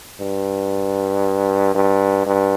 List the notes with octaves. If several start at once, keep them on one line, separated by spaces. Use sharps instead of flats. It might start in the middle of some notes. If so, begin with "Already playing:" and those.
G2
G2
G2